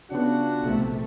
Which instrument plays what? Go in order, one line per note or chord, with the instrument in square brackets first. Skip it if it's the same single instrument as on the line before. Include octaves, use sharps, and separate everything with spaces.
[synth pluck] C#3 B3 [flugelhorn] D4 [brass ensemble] F4 F#4 F#5
[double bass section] A#1 C3 A3